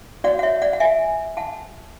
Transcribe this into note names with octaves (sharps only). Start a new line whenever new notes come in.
F#4 C#5 D5 F#5
F#5
C#5 E5
D5 F#5
F#5
E5 G#5
F#5 A5